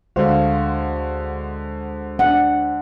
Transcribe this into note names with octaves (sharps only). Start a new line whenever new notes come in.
D2 D3 G#3 F#4 C5 F5
D4 F#5